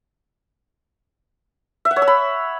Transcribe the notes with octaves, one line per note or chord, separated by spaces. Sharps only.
E5
F#5
C#5
E6
B5